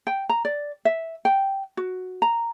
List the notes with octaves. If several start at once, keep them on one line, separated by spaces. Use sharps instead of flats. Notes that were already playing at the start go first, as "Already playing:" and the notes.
G5
A#5
D5
E5
G5
F#4
A#5